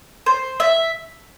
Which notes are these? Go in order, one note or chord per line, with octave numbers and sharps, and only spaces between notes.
C5
E5